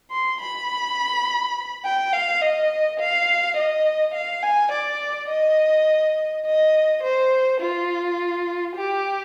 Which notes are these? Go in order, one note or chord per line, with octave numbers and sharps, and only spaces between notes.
C6
B5
G5
F5
D#5
F5
D#5
F5
G#5
D5
D#5
D#5
C5
F4
G4